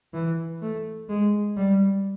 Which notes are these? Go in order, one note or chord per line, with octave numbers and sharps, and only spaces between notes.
E3
A3
G#3
G3